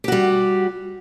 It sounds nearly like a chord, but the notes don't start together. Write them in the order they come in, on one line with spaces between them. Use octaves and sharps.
G4 F#4 G3